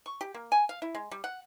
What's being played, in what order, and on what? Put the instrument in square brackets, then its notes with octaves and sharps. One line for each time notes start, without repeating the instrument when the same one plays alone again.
[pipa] C#6
G4
A#3
G#5
F5
E4
G#3
G3
F#5